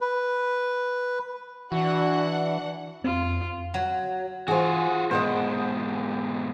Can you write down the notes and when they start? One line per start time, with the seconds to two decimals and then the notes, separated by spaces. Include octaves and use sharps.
0.01 B4
1.72 E3 D4 F#4 F#5
3.04 F2 C4 F4
3.74 F#3
4.48 E3 F4 F#4 G#4 C5 G#5
5.11 G#2 B2 A#4 C5 D#5 F#5 G5